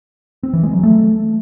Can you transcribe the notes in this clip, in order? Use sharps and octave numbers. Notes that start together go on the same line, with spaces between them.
C4
E3
G#3
F#3
A3